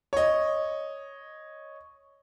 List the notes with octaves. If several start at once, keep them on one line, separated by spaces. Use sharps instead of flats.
C#5 D#5